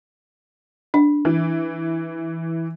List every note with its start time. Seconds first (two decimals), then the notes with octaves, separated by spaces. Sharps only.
0.94 D4
1.25 E3